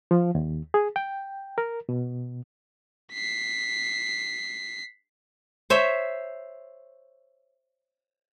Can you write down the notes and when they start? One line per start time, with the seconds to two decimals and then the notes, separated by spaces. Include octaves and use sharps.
0.11 F3
0.35 D#2
0.74 G#4
0.96 G5
1.58 A#4
1.89 B2
3.13 B6 C7
5.70 C5 C#5 E5